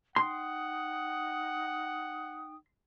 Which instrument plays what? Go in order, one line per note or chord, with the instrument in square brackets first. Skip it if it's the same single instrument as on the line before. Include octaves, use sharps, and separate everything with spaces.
[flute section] D#4 G5 D#6 [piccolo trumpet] F#5 [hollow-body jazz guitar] C6